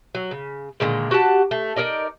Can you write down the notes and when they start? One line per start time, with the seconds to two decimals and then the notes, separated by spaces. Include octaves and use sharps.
0.15 F#3
0.31 C#3
0.80 A#2 D3 D#3 G#3
1.11 F#4 G4 F#5 A5
1.51 A3
1.76 D#4 A#4 D5 D#5